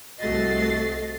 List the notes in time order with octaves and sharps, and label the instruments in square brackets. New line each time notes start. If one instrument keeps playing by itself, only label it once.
[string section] C2 A3 F#4 D#5 A6 C7